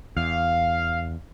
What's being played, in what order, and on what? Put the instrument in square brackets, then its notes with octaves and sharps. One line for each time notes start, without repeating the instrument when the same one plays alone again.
[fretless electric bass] E2 [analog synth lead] F5